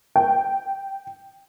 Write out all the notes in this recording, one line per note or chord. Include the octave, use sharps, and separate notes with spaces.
G5